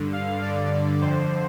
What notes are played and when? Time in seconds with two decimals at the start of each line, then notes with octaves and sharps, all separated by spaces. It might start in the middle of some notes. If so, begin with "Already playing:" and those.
Already playing: G2 D3
0.13 F5
0.42 G2 D3 D5
1.01 F2 D3 C5